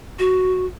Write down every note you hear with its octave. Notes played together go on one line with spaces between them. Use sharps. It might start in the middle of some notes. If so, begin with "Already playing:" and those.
F#4